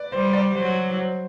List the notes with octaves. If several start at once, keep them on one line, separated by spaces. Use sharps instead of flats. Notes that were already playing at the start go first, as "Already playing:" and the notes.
Already playing: B4 D5
G3 C5
D5
F#3 C5
C5